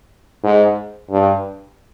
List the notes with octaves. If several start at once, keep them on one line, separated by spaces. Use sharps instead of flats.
G#2
G2